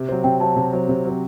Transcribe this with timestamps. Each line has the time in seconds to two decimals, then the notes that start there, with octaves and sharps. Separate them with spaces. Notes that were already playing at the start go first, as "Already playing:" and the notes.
Already playing: C3
0.09 F#3 C4
0.24 C3 G5
0.40 F#3 C4 A5
0.56 C3
0.73 F#3 C4
0.89 C3
1.05 F#3 C4